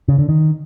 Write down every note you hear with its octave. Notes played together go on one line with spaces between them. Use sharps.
C#3
D3
D#3